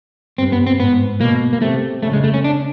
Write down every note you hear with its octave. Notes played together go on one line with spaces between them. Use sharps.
G2 C4
B3
C4
G#2 B3
B2 A#3
A#3
C3 A3
C#3 A3
G#3
A3
C#4
D4